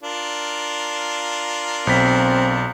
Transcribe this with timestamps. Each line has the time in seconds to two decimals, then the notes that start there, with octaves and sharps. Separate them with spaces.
0.03 D4 F4 A#4
1.87 B1 C4 B6